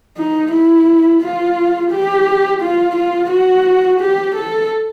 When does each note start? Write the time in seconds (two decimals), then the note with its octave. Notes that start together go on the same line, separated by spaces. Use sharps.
0.17 D#4
0.52 E4
1.21 F4
1.91 G4
2.61 F4
2.96 F4
3.31 F#4
4.00 G4
4.35 A4